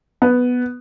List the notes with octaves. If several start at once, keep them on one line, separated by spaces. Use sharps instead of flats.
B3